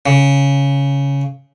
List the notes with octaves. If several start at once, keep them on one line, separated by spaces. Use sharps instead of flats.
C#3